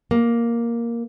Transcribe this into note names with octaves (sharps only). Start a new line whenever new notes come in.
A#3